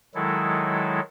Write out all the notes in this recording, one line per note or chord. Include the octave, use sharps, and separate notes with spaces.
D#3 F#3 G#3 E4 A4